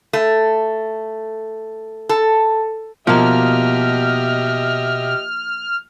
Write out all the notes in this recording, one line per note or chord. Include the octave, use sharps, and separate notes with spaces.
A3
A4
B2 F3 A#3 G4 D#5 E5 F6